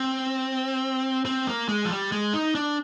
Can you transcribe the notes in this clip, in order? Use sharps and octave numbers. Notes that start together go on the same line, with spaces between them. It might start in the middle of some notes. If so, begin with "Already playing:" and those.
Already playing: C4
C4
A#3
G#3
F3
G3
G#3
D#4
D4